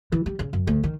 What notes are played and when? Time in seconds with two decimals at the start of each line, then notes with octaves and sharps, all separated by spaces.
0.12 E3
0.26 G3
0.39 C#3
0.53 F#2
0.67 D2
0.83 D#3